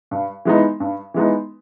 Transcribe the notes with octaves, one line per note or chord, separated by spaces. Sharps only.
G2
E3 G#3 B3 D#4
G2
E3 G#3 B3 D#4